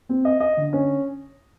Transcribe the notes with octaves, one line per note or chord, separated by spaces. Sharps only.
C4
D#5
D#5
D3
C#4